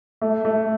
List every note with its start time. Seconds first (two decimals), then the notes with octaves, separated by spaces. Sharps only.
0.22 A3
0.45 A3